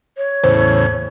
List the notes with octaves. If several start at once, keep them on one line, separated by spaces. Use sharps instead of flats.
C#5
E2 A2 C#3 C5